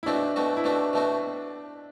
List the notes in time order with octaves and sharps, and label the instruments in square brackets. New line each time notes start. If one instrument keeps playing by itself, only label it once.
[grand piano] E4
[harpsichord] B2 A3 C4 F#4 [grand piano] D4
[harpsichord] B2 A3 C4 F#4
[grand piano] E4
[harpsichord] B2 A3 C4 F#4 [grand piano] D4
[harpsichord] B2 A3 C4 F#4